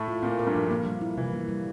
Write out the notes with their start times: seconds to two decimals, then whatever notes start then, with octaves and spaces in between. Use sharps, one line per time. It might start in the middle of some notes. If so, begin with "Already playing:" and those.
Already playing: A2 A3
0.08 F4
0.23 A#2 A#3 C4
0.39 A#4
0.47 G2 G3
0.55 F3
0.71 A#3
0.86 G3
1.01 E4
1.17 C3 E3
1.33 A#3
1.49 G3